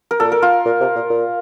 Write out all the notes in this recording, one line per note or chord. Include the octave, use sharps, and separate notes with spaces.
A#4
A#2 A4
A#4
F4
A#2
C3
A#2
A#2